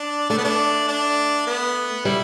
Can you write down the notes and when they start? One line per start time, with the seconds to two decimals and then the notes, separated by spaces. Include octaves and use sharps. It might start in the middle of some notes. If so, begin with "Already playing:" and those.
Already playing: D4
0.29 A3 D4
0.38 B3
0.44 D4
0.88 D4
1.47 B3
2.05 G3 E4